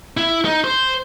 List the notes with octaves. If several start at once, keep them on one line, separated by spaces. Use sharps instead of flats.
E4
D#4
C5